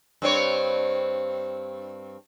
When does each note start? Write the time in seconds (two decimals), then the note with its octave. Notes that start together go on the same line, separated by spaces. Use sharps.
0.22 G2 C4 C#5